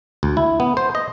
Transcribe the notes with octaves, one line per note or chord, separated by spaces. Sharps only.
D2
E4
B3
C5
D#5